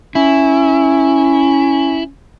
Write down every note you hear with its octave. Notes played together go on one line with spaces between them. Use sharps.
C#4 E4